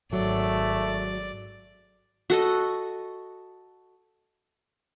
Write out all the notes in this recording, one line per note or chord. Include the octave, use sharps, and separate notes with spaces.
G#1 F#3 A3 D5
F#4 A4 D#5